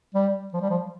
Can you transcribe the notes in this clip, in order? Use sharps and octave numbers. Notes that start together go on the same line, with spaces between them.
G3
F3
G3
F3